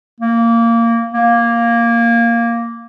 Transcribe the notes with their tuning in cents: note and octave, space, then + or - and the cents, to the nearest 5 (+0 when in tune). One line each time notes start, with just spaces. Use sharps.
A#3 -15
A#3 +0